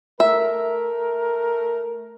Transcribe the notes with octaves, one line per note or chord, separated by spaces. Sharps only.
A3 A#4 E5